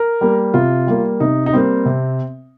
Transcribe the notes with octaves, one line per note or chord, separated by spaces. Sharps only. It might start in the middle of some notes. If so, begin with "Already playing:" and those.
Already playing: A#4
G3 A#3
C3 F4
G3 A#3
C3 D#4
D#4
G3 A#3 C4
C3